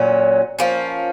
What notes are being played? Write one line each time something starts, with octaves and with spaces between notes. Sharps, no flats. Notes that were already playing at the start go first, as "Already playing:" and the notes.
Already playing: A#2 F#3 C#4
F3 A#3 C#4